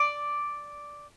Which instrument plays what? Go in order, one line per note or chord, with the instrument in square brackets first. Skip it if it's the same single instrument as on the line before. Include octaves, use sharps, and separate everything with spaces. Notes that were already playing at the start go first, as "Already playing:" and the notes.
Already playing: [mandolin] D5